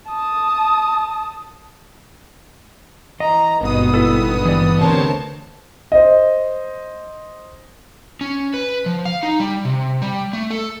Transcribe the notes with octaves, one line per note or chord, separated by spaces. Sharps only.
A5 D#6
E3 D#5 A#5
G#1 G2 B2 B3 D#6
E4 A4
E3 D5
D2 C3 A#4 C5 C#5 A5
C5 D#5
C#4
B4
F3
F5
D#4
G3
C3
G3
A3
A4